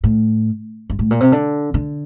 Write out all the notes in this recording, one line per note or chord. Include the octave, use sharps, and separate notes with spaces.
A2
G2
A2
A#2
C3
D3
D3